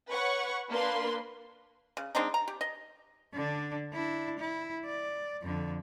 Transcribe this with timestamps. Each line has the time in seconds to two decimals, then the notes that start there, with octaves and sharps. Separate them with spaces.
0.11 B4 C#5 F#5 C#6
0.70 A#3 D4 B4 C6
1.97 C#3
2.15 G#3 C4 D4 D#4
2.34 A#5
2.48 G4
2.61 D#5
3.34 D3 D4
3.93 D4 E4
4.39 E4
4.85 D5
5.42 F2 D3